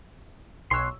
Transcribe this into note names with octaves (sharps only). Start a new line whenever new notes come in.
B1 C#5 C6 E6 F#6